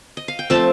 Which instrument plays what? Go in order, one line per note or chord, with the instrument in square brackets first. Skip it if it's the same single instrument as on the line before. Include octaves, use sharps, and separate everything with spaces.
[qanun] D#5
F5
G5
F3 A3 C4 A5